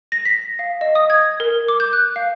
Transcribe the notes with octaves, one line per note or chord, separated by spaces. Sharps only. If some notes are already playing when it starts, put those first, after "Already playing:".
A#6
B6
F5
D#5
D#6
G#6
A#4
D6
G6
F#6
F5